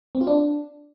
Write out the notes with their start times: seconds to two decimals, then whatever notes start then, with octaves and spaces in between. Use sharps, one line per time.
0.15 C4
0.21 F4
0.27 D4